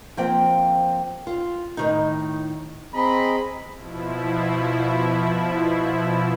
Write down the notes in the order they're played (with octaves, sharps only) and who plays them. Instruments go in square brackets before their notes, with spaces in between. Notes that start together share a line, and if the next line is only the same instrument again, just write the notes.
[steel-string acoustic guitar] F3 A#3 C4 G5
F4
A2 D#3 D#4
[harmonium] C4 G#4 D#5 [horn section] A#5 B5
[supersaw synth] B2 F3 E4